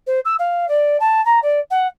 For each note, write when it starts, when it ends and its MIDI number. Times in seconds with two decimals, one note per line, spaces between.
0.07 0.20 72
0.25 0.35 88
0.39 0.68 77
0.68 0.97 74
1.00 1.24 81
1.25 1.39 82
1.43 1.60 74
1.71 1.87 78